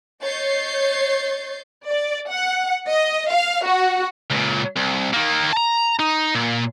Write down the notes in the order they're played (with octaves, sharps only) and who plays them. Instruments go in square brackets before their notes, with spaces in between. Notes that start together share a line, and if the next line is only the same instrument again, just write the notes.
[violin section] C#5 D#5 G6 A6 C7
D5
F#5
D#5
F5
F#4
[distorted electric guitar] C#2 A#2
C2
D#3 A#3
A5 A#5
D#4
A#2